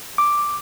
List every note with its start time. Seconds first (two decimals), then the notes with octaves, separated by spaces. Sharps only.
0.18 D6